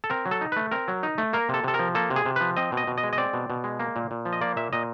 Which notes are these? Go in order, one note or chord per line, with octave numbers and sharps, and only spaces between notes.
A4
C4 A#4
F#3
A4
D#4
A3 B4
C4 A#4
F#3
D#4
A3
A#3 A#4
C3 A4
C3 A4
A#4
F3
A#3 A4
C3
G#4
C3
F3 B4
C4 D#5
B2 D#5
B2
D#5
G#3
D#5
C4 D5
B2
B2
G#3
A#3
A#2
A#2
F3
D#5
A#3 D5
A#2 E5
A#2 D#5